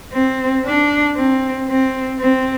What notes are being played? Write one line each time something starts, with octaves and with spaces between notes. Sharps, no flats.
C4
D4
C4
C4
C4